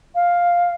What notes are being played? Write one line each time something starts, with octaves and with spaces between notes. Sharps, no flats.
F5